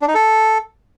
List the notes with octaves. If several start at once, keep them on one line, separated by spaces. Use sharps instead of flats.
D4
D#4
A4